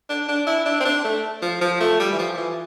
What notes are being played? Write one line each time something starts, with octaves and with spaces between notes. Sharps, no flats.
D4
D4
E4
D4
C4
D4
A3
F3
F3
A3
G3
E3
F3
E3